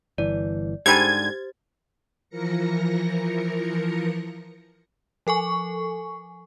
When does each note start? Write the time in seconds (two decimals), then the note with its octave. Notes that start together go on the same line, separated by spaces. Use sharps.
0.18 G1 E3 D5
0.86 G#2 D3 G3 G4 C5 G#5 G#6 A6
2.29 E3 F3 A#4 A#6 C#7
5.27 F3 A4 G#5 C#6